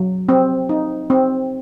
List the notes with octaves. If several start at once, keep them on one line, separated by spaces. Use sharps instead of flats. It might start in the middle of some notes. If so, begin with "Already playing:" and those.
Already playing: F#3
C4
D#4
C4